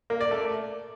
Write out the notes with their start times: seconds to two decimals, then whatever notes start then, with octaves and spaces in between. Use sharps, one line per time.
0.10 A#3
0.21 D5
0.31 A3